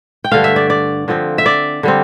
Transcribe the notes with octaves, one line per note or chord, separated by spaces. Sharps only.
G5
G2 D3 A3 F5
E5
D5
D5
D3 F3 C4
E5
D5
D3 G3 C4